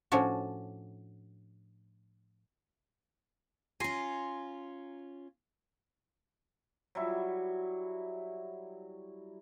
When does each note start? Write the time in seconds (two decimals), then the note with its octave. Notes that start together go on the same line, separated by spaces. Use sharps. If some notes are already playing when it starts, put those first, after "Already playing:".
0.12 A2 F3 C#4 D4 F#4
3.80 C#4 F4 G#5 A#5 C6
6.95 F#3 G3 E4